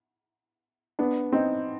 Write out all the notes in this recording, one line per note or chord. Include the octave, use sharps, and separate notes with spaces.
B3 D4
C4 D#4